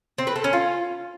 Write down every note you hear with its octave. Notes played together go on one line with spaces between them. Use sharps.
C4
B4
A4
C#4
F4